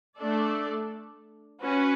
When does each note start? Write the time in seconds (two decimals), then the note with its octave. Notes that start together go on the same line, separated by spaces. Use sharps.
0.17 A3 D4 A4 D5
1.62 C#4 F#4 B4